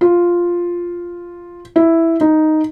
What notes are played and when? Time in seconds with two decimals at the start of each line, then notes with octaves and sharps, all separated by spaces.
0.01 F4
1.76 E4
2.21 D#4